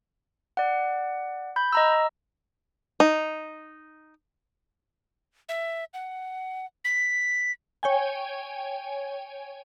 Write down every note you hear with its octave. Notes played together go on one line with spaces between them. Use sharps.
D5 F#5
B5 G6
D#5 A#5 E6
D#4
E5
F#5
B6
C#5 G5 G#5